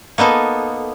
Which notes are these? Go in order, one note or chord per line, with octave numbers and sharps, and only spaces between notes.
A#3 B3 D#4 A4